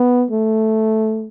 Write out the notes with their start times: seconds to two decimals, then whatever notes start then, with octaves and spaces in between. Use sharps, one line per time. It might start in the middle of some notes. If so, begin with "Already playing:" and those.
Already playing: B3
0.31 A3